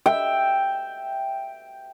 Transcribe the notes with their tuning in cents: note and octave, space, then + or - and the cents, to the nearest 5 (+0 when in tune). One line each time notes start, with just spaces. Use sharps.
E5 +0 G5 +0